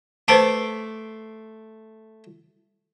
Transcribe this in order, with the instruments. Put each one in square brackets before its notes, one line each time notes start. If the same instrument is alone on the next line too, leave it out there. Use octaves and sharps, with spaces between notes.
[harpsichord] A3 C6 D6 [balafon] B4 C5 A5